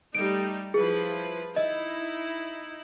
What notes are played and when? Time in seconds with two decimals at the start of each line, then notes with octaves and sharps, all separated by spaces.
0.15 G3 A3 D#4 D7
0.74 F3 E4 G#4 B4
1.56 D#4 E4 D#5